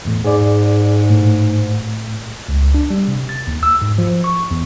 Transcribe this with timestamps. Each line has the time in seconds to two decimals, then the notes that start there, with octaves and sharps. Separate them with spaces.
0.05 E2 A2
0.25 G#2 G#4 D5
1.10 A2
2.49 C#2
2.74 D4
2.90 G3
3.08 C3
3.29 A6
3.47 D#2
3.63 E6
3.82 G#2
3.98 F3
4.24 C#6
4.51 E2